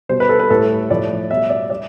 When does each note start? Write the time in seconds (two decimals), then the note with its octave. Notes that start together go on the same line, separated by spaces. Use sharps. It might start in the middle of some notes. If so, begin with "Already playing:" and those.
0.09 B2 G3 C5
0.20 B4
0.29 A4
0.40 B4
0.50 A2 G3 A4
0.90 A2 F3 D5
1.31 B2 G3 E5
1.50 D5
1.70 G3 D5